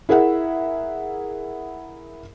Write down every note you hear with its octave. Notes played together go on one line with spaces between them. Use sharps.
E4 G#4 A#4 E5 F#5